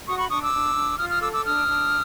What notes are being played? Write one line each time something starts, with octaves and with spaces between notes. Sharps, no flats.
F#4 C#6 D#6
B5 C#6
D4 C#6 D#6
D6 E6
D4
D4
F4 D#6 F6
D#6 F6
A4 D6 E6
D6 E6
D4 D#6 F6
D4